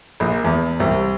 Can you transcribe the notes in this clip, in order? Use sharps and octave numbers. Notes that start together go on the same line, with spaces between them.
A#1
E2
C2